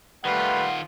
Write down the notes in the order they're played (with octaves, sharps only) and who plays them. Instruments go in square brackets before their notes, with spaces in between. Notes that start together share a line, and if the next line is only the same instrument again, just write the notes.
[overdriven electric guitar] D#3 F4 [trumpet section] G3 A3 B4 [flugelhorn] F#5